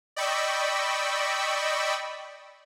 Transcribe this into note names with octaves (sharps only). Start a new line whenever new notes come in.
D5 D#5 G5 B5 C#6 E6